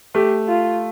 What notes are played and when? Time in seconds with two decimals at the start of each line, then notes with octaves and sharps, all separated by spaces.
0.15 A3 G4
0.48 F4